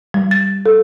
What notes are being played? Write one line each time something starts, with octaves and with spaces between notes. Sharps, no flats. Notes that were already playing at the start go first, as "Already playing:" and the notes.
G3
A6
A4